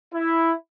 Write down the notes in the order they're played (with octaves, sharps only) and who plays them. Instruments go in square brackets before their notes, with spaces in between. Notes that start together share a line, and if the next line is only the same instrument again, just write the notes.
[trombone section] E4